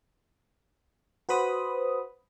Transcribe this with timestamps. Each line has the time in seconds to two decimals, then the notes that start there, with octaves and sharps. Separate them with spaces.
1.29 F#4 B4 C5 B5 D#6